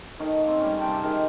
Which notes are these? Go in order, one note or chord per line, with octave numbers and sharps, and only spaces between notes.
D#3 A3 D#4 C#5
A#3 C4
G3 C#4
C3 C4 G5 A5
D#3 G4 G#4 A#4